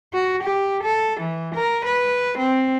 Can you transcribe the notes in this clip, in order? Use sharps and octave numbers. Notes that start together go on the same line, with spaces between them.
F#4
G4
A4
E3
A#4
B4
C4